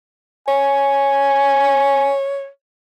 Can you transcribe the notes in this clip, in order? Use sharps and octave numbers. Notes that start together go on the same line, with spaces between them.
C#5 G#5